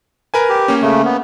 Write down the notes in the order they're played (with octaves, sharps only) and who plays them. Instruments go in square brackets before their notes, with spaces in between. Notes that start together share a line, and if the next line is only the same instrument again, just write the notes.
[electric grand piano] A#4 B4 G#5
[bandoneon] G4
[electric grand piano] A#3 C#4
[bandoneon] C#3 A3
B3